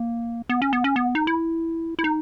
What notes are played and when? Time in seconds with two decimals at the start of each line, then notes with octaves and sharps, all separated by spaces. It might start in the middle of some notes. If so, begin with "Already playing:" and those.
Already playing: A#3
0.49 B3
0.62 C#4
0.73 B3
0.84 C#4
0.96 B3
1.15 D#4
1.27 E4
1.99 E4
2.04 D#4